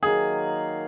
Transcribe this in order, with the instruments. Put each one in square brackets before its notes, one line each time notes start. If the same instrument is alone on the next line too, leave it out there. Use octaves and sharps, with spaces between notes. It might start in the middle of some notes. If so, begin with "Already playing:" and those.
[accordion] D#3 F#3 A#3 D#4 A#4 [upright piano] G#4